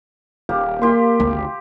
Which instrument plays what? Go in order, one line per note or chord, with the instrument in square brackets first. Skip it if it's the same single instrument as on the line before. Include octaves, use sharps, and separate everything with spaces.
[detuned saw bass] D#1 [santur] A#3 G4
[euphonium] A#3 [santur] F4 G4 C6
[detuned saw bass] G#1 [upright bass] D2